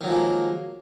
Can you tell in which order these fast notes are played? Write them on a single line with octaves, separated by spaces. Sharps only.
D#3 F#3 F3 G#3 A#3